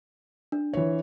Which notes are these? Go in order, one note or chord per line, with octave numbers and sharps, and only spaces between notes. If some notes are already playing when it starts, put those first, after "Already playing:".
D4
E3 C#5